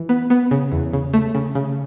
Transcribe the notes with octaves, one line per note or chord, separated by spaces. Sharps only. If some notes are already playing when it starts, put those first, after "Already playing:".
Already playing: E3
B3
B3
C#3
E2
C#3
A3
C#3
C#3